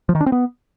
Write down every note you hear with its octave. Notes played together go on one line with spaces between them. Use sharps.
F3
D#3
D4
C4
B3